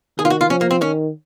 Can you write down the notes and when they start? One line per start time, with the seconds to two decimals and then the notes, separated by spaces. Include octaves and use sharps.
0.19 D#3 G#4
0.25 F4
0.30 F#4
0.41 F4
0.50 F3 C#4
0.61 A#3
0.71 C4
0.81 D#3 C#4